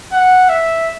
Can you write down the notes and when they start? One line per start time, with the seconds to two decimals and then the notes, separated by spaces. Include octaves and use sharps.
0.12 F#5
0.49 E5